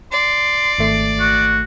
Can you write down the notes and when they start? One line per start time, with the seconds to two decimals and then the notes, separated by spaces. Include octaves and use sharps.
0.12 D5 C6
0.78 G#1 A3 C7
1.19 F#4